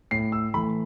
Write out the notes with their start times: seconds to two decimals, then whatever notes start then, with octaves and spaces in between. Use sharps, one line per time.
0.11 A2 C7
0.32 E6
0.54 E3 A3 B5